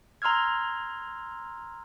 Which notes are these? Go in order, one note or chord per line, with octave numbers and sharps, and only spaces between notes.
A#5 C6 E6 F6 G#6